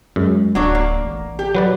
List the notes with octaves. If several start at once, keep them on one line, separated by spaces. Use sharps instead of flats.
F#2 G#3
D1 F#3 D4 C#5
A#3
A1
G4
F#3 B4 D5